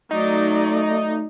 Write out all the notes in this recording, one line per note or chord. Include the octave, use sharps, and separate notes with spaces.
F#3 A3 D#4 D5